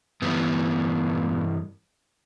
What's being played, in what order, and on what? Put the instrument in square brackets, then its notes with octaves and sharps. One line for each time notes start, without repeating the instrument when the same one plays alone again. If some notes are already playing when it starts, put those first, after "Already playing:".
[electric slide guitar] G2 E3 G3 B3